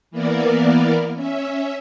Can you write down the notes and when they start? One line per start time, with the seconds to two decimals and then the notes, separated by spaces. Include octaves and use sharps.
0.11 E3 A#3 B3 A#4 D5
1.16 C#4 E5